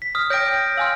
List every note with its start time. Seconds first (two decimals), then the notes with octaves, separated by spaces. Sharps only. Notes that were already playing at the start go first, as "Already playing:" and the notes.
0.02 B6
0.15 D#6 F6
0.30 C#5 G5 G6 A#6 D7
0.77 F5 G#5 C6 E6 F6